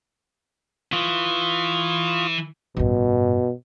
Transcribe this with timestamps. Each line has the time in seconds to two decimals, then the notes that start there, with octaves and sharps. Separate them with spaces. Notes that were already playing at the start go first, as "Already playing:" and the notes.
0.92 E3 F4 C#6 D#6
2.77 A1 G2 B2